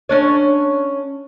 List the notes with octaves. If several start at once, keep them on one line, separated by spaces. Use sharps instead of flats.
C#4 D4 C#5